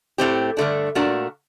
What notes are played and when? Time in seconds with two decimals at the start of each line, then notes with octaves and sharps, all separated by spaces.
0.18 A2 A3 C4 G4
0.57 G2 D3 A3 D4
0.95 A#2 A3 D4 F#4 A#4